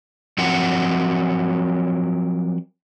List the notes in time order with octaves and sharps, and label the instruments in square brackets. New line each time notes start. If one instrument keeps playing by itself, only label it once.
[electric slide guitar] F3 F#3 C4 A#4 F#5